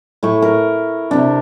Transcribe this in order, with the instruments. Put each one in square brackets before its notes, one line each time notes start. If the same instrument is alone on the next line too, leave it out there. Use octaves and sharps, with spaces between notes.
[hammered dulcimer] A2 E4 C#6
A#4
C3 D4